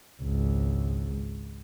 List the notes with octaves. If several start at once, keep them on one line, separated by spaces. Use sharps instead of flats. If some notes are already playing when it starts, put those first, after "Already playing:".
G#1 C#2